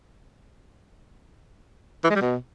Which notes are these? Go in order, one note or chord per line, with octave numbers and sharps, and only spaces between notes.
E3
G#3
G3
B2